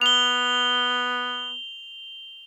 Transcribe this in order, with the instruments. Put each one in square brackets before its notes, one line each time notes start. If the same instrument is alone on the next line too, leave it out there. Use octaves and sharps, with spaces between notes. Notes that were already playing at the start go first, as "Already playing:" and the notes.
[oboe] B3 [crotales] F7 G7